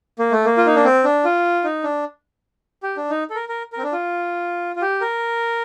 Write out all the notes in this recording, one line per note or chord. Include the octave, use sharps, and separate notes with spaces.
A#3
A3
A#3
F4
D#4
D4
C4
D4
F4
D#4
D4
G4
D4
D#4
A4
A#4
A#4
C4 A#4
D4
F4
F4
G4
A#4